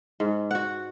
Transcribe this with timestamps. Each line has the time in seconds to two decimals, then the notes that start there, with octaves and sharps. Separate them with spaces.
0.20 G#2
0.51 F#4 F#5